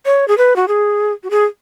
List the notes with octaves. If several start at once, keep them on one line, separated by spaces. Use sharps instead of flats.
C#5
G#4
B4
F#4
G#4
F#4
G#4